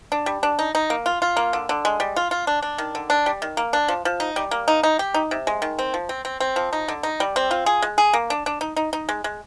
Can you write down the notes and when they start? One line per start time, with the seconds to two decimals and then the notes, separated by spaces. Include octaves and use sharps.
0.12 D4
0.26 G3
0.43 D4
0.59 D#4
0.75 D#4
0.90 A#3
1.06 F4
1.22 F4
1.37 A#3
1.53 D3
1.69 D3
1.85 G#3
2.00 G3
2.16 F4
2.31 F4
2.47 D4
2.62 D4
2.78 D#3
2.95 D3
3.10 D4
3.26 G3
3.42 D#3
3.57 A#3
3.73 D4
3.88 F3
4.05 F3
4.20 D#4
4.36 G3
4.51 A#3
4.68 D#4
4.83 D#4
4.99 G4
5.14 D#4
5.31 C3
5.47 G#3
5.62 D#3
5.79 C4
5.94 F3
6.09 C4
6.25 C4
6.40 C4
6.56 F3
6.73 D#4
6.88 D3
7.03 D#4
7.20 G3
7.36 C4
7.51 F4
7.66 G#4
7.82 G#3
7.98 G#4
8.14 A#3
8.30 D4
8.46 D4
8.61 D#4
8.76 D#4
8.93 D#4
9.09 G#3
9.24 G#3